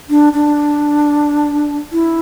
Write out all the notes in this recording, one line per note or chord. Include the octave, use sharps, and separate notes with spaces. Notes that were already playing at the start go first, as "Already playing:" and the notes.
D4
D4
E4